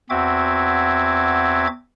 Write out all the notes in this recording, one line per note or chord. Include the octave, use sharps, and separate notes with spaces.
E2 C4 F#4 E5 D6 G#6